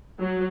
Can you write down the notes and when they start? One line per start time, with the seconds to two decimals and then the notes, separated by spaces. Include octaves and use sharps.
0.19 F#3